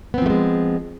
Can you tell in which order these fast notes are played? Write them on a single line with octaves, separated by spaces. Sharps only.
B3 C4 F3 A3 G#3